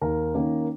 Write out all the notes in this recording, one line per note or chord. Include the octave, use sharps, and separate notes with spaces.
D#2 A#4
D#3 A#3 C#4